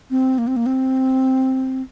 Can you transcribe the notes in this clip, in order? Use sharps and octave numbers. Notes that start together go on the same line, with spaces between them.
C4
A#3
C4
A#3
C4